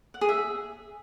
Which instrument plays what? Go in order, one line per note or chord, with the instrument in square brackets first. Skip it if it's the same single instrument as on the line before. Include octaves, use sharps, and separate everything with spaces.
[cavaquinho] F#5
G#4
E5